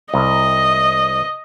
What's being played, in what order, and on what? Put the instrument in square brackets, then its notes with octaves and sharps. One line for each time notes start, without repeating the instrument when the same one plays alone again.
[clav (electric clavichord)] C2 [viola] D#5